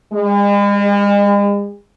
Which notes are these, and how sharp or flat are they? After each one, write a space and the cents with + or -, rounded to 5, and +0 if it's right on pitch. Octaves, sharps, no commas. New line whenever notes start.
G#3 -45